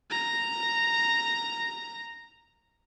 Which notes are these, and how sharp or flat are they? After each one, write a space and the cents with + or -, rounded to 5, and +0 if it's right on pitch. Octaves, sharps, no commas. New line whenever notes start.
A#5 -5